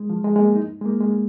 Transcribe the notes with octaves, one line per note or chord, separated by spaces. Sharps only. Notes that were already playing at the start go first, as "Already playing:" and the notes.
Already playing: G#3
F3
G#3
G#3
A#3
D#4
G#3
A#3
G#3